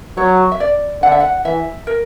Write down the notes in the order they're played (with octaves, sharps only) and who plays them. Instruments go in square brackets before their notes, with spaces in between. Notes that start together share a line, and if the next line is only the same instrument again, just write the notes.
[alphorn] F#3 [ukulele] C#5
[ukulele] E5
D5
[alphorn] D3 [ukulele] F#5
[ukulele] E5
F#5
[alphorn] E3 [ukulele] E5
[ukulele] A#4